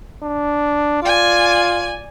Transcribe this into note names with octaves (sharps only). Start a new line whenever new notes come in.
D4
F4 D5 G#5